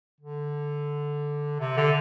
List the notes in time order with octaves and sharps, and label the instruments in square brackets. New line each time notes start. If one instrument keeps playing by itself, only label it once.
[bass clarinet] D3
C3
D3